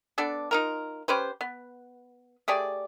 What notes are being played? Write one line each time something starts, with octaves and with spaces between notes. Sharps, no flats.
B3 D4 A4 D5
D#4 F4 A#4
C#4 G4 B4 C5
B3
A3 G4 G#4 D5